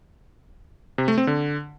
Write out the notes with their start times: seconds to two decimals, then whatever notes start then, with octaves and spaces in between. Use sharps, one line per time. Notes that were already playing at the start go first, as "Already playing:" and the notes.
0.98 C3
1.08 A3
1.18 C4
1.27 D3